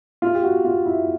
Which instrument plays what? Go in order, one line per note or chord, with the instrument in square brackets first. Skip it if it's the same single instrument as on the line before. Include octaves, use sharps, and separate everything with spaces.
[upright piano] F4
G4
F#4
F4
E4